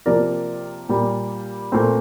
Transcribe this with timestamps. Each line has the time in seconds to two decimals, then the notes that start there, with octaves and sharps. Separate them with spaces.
0.06 C3 F3 A#3 A#4 D5
0.89 A#2 G3 A#3
1.72 A#2 A3 C4